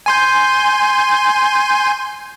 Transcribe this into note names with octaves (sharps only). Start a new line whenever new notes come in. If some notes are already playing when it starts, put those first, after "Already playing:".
G#5 C6 G6